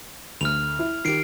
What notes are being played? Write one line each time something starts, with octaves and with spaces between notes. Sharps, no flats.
D2 F6 F7
E4
D#3 G4 C7 D7